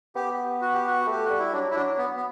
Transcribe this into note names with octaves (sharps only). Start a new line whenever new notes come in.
B3 G4
F#4
G4
F#4
A3 G4
G3 F#4
E4
F#3 D4
E4
F#3 D4
B3
B3